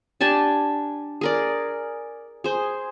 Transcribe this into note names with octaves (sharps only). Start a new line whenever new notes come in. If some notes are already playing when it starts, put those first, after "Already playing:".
D4 G4 G#5 A5
G#4 A#4 D5
G#4 C5